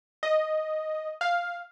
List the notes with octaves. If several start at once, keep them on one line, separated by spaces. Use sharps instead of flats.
D#5
F5